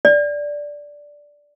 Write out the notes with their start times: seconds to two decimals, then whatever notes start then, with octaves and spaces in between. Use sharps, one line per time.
0.05 D5